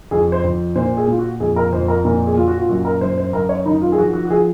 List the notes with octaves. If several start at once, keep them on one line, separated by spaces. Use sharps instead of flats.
F2 G#4
C5
F2
A#2 C5
G#4
A#2 F4
F#4
F2 G#4
A#4
F2 C5
A#4
A#2 A#4
G#4
A#2 F4
F#4
F4
F#2 F#4
A#4
F#2 C5
C5
F#2 A#4
C#5
D#3 D#4
F4
G#4
F3 F#4
F#4
F#4
F3 G#4